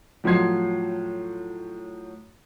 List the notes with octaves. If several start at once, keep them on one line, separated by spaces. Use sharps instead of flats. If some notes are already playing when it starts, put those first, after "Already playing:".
A2 F3 F#3 C6 G#6 C7